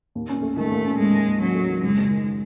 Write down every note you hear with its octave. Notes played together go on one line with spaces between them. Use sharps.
D#2
C#4
A3
D#3 A3
D#2
C#4
G#3 A3
D#3
D#2
F#3 C#4
A3
D#3
F#1 G#3
F#1
D#3